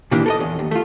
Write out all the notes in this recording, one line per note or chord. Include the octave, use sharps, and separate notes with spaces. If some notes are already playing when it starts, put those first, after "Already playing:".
A#2 D#3 E3 A#3 D4 G4
A4 A#4 D#5
E2
D#2
A3 F4